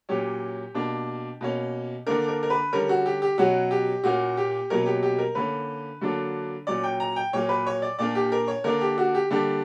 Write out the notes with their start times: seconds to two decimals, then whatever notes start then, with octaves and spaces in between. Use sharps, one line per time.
0.09 A#2 F#3 C#4 G4
0.74 B2 A#3 D4
1.41 B2 A#3 C#4
2.07 D3 A#3 D4 A#4
2.28 A#4
2.43 A#4
2.50 B4
2.73 D3 G3 C#4 A#4
2.89 F#4
3.06 G4
3.22 G4
3.38 B2 F#3 C#4 F#4
3.71 G4
4.04 A#2 A#3 C#4 F#4
4.37 G4
4.70 B2 F#3 A#3 C#4 A#4
4.86 G4
5.03 G4
5.18 A#4
5.35 D3 A#3 C#4 B4
6.01 D3 F#3 A#3 D4
6.67 A#2 F#3 C#4 D5
6.84 G5
7.00 A#5
7.16 G5
7.33 A#2 F#3 A#3 C#5
7.49 B4
7.67 C#5
7.82 D5
7.99 A#2 A#3 D4 D5
8.15 G4
8.32 A#4
8.48 C#5
8.64 D3 A#3 D4 A#4
8.81 G4
8.98 F#4
9.15 G4
9.31 D3 G3 A#3 D4 G4